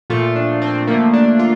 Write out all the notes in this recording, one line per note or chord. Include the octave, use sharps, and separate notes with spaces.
A#2 F3 A3 F4
D4
C4
D3 F3 A3 A#3
D4
F4